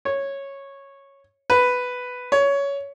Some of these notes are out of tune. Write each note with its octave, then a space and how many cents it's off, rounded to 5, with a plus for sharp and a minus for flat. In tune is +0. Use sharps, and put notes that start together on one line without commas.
C#5 -10
B4 +5
C#5 +15